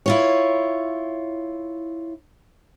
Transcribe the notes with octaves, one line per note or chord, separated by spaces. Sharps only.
E4 F4 C#5